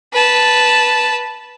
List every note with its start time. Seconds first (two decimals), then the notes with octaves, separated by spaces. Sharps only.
0.13 B4 A5